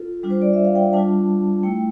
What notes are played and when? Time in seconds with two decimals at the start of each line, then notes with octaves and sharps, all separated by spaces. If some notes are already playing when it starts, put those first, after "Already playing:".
Already playing: F4 A4
0.23 G3 D4 F4
0.30 C5
0.42 D5
0.53 E5
0.65 F5
0.75 G5
0.93 G3 D4 F4 A5
1.63 A3 E4 G5